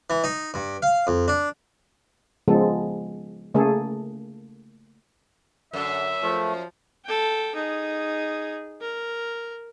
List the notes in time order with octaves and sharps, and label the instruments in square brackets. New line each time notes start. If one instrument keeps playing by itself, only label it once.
[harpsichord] E3
D#4
G2
F5
F2
D4
[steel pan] C#3 F3 G#3 B3 A4
C#3 A3 A#3 G#4 A4
[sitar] F#2 [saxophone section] D3 [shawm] E5
[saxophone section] F3 [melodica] A3
[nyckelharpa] A4 G5
D#4 G#4
A#4